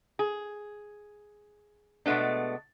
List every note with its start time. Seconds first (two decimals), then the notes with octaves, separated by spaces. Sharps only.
0.19 G#4
2.06 B2 G#3 A3 B3 D4